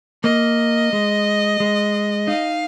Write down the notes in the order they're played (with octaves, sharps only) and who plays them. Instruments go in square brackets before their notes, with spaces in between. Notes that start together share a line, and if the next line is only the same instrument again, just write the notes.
[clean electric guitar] A#3 [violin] D#5
[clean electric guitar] G#3
G#3
[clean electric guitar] D#4 [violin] F5